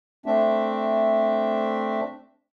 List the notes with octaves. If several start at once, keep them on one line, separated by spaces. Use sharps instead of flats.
A3 C4 D4 E5